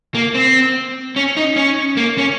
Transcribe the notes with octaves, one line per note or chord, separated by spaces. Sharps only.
A#3
C4
C#4
D#4
C#4
A#3
C#4